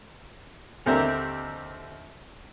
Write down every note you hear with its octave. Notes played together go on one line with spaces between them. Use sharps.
D#2 D3 C4 G4 A#4 E5